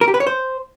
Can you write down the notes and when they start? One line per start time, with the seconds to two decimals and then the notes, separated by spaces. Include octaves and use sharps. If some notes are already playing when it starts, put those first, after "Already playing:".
0.01 A#4
0.08 G4
0.14 B4
0.20 C#5
0.27 C5